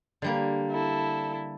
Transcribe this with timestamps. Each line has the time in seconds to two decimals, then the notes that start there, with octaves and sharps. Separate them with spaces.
0.22 D3 G3 A#3
0.70 E4 A4